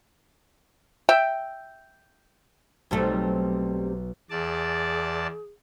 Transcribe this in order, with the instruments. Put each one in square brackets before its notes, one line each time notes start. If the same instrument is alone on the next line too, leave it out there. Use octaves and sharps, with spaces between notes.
[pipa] E5 G5
[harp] B1 [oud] C3 G3 A3
[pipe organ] E2 D5 A5 [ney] G#4